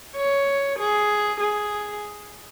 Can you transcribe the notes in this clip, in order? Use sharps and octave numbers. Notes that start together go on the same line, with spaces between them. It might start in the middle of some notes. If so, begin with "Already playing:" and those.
C#5
G#4
G#4